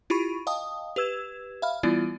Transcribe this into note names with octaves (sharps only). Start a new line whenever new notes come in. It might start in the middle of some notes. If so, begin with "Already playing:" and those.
E4 F4 G4 B5 C#6
D#5 F5 G5 A5 D#6
G4 B4 E6 G#6 E7
E5 F5 B5 F6
E3 G3 B3 E4 F4 D5